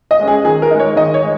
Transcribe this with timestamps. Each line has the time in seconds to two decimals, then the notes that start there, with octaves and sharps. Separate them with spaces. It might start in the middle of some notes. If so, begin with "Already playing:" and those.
0.11 D#5
0.19 G#3 C#4
0.28 G#4
0.45 D#3 G#4
0.62 A#4
0.70 G#3 D#4
0.80 C#5
0.96 D#3 D#5
1.14 C#5
1.22 G#3